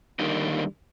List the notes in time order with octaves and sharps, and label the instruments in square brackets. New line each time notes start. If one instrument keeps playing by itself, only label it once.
[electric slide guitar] D3 D#3 G3 A#3 D#4